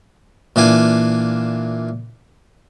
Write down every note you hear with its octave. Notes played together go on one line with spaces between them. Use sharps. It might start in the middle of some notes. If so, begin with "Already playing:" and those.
A#2 E3 D4 F5 G#5